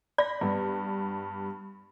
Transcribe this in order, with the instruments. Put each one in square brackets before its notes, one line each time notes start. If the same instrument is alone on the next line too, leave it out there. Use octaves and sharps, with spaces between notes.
[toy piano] D5 [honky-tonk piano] B5 A#6
[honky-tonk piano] G2 G3 B3